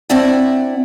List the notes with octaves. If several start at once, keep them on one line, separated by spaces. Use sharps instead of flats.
C4 D4 E4 D5 E5 F#5